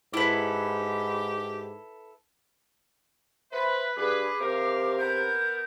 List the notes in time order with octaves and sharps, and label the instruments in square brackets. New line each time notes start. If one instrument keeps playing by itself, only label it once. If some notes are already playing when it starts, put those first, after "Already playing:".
[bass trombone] G#2 [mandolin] E4 A4 B4 [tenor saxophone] G4
[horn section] B4 [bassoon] C5 [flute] E5
[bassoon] G2 [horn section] G#4 B4 [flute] D6
[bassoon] C3 [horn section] G4 A#4 F5
[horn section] B3 A#4 [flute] G6